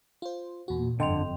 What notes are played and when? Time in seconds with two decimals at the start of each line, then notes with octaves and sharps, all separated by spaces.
0.22 F4 C5
0.68 E2 A#2 F#4
1.00 G1 F2 D3 D#5 G5 C6 F7